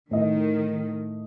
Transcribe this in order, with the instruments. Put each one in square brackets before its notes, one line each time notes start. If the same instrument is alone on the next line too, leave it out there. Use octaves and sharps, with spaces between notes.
[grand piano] A2 D#5 [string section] D#3